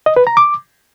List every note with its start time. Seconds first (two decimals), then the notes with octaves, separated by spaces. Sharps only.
0.06 D#5
0.16 B4
0.27 A#5
0.37 D6